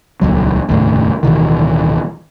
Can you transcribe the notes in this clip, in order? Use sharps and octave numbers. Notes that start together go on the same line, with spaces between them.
D#1 C#2 F#3
F1 D#2 A2 C#3
D1 B2 D#3 E3